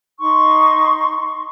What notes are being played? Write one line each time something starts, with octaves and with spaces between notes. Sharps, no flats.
D#4 C6 C#6